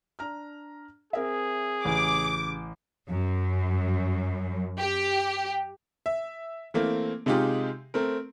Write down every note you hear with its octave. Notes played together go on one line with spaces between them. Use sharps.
D4 A#5 F6
C4 G#4 A#4 E5
A1 C#3 G#5 D6
F#2
G4
E5
E3 A3 A#3 C4
C3 G#3 D#4 F4 G4 G#4
A3 C4 A#4